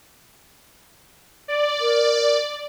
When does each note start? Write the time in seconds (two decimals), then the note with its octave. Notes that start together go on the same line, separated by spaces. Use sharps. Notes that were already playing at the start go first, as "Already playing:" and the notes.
1.48 D5
1.80 A#4